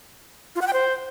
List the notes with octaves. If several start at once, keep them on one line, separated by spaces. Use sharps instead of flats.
F4
F#5
G5
C5